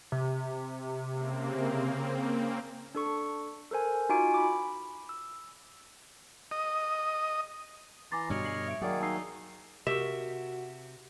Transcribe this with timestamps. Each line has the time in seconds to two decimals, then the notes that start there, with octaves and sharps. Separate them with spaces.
0.12 C3
1.10 C#3 A#3 C4
2.95 D4 A4 C#6
3.71 A4 A#4 C5 G#5
4.09 D#4 F4 F#4 G#5 D6 D7
4.34 B5 D6
5.09 E6
6.51 D#5
8.12 E3 G#5 A#5 C6 D6 A6
8.30 G2 B2 D3 F#4 C#5 D#5 F6
8.44 C7 F#7
8.68 E5 D7
8.81 D#3 F#3 A#3 G#4 D5 F#5
9.01 D#4 A5 E6 C7
9.87 C3 F#4 G4 A#4 E5 C#6